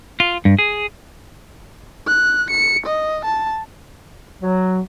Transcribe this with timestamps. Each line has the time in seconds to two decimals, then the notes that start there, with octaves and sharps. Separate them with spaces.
0.20 F4
0.45 G2
0.59 G#4
2.07 F#6
2.50 C#7
2.86 D#5
3.25 A5
4.41 F#3